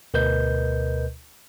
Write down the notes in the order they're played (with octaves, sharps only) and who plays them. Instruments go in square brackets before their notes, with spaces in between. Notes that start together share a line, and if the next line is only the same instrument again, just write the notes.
[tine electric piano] D2 B2 A#4 B4 D#5 G6